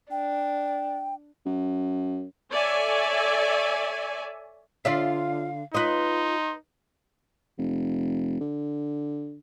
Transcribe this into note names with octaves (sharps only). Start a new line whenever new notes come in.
D4 G5
F#2
A4 C#5 D5 E5 G#5
D3 F4 D5 E5 F5
D#4 F4 B4 D#5 C6
F1
D3